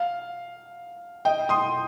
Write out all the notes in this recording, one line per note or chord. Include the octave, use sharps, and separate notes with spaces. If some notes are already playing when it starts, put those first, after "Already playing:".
Already playing: F5
D#5 G5
C6 D#6